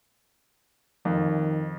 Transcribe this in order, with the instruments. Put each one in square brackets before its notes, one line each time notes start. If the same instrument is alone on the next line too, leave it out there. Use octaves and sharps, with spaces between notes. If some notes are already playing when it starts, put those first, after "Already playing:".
[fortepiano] F2 [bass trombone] D#3